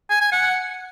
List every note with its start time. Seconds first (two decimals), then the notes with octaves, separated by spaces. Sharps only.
0.10 G#5
0.21 G#5
0.32 F#5